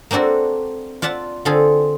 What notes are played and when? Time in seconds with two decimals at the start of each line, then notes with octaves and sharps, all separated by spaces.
0.11 A#3 C4 D4 F#4 A4
1.02 F4 D5 E5 F#5 A5
1.45 D3 C4 F4 G#4 A4